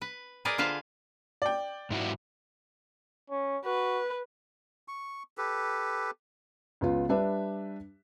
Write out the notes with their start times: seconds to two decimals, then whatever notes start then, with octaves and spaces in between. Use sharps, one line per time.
0.02 B4
0.45 G#4 A#4 B4 D5 D#5
0.58 D3 F4 B4 C5 F5
1.42 D5 G5
1.90 G#2 E4 F#4
3.30 C#4
3.65 F#4 B4
4.88 C#6
5.38 G4 A4 B4
6.81 C#2 B3 F4
7.09 G3 D4 G4 B4 E5